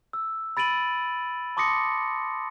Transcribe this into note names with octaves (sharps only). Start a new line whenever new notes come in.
E6
B5 A6 D7 D#7 F#7
A5 C6 D6 D#6 A#6 C#7